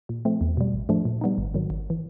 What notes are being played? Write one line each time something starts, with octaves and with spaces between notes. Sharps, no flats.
A#2
F3 A3 C4
E2
B2 G3
A1
A2 F3 A3 D4
A#2
G3 B3 D#4
G#1
G#2 D#3 F#3
G#1
E3